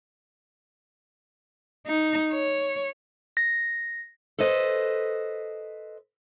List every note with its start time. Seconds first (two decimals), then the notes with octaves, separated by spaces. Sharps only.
1.86 D#4
2.32 C#5
3.37 A#6
4.39 A4 B4 C5 D#5